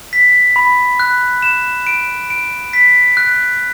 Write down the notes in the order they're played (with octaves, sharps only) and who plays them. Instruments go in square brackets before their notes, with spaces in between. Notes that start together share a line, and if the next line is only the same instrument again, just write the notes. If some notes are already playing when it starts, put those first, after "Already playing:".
[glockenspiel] B6
B5
F#6
E7
D7
D7
B6
F#6